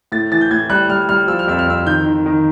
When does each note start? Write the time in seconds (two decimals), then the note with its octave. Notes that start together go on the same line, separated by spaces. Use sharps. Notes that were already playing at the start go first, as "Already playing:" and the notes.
0.12 A2 A6
0.32 E3 A6
0.41 G6
0.51 A2 G#6
0.70 G3 F#6
0.89 G3 F6
1.09 G3 F6
1.28 F3 E6
1.39 F6
1.48 F2 E6
1.59 F6
1.67 F2 E6
1.86 D#3 G6
2.06 D#3
2.26 D#3